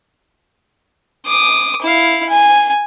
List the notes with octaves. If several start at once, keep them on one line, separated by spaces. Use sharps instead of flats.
D6 D#6
E4 F5
G#5